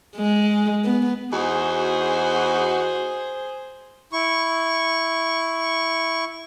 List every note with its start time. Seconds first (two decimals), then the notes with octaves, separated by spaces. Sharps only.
0.16 G#3
0.84 B3
1.32 E2 D#4 F#4 G#4 C5
4.13 E4 C#6